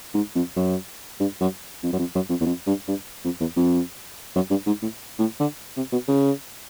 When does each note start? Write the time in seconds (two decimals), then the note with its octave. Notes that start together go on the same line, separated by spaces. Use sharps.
0.14 G#2
0.35 F2
0.56 F#2
1.20 G2
1.40 F#2
1.83 F2
1.93 F#2
1.99 F2
2.15 F#2
2.29 F2
2.40 E2
2.46 F2
2.67 G2
2.88 G2
3.24 F2
3.40 E2
3.56 F2
4.35 F#2
4.50 G2
4.66 G#2
4.82 A2
5.19 A2
5.40 D3
5.77 C3
5.92 B2
6.08 C#3